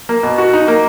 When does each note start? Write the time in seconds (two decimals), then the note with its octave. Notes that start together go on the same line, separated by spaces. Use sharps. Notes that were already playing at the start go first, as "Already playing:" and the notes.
0.09 A#3
0.23 B2
0.38 F#4
0.53 D#4
0.68 A#3